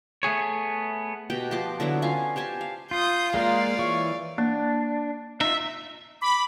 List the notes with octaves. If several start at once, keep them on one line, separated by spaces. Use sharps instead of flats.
A3 B3 G#4 C#5
B2 G4 G5
F3 A5 C6 D6
D3 F#3 B3 E4
C#4 F4 F5 G#5
G4 C5 G#5 A5
F5
F4 D#6 G6
G#3 A#3 F4 D5 F5
E3 C#5 C#6
A#3 D4
D#4 F4 E5
B5 D6